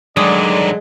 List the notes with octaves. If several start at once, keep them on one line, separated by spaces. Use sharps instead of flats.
G2 D3 D#3 F#3 G#3 D5